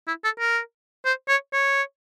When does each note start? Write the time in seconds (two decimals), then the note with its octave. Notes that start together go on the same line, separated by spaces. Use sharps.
0.07 E4
0.24 A4
0.40 A#4
1.05 C5
1.29 C#5
1.53 C#5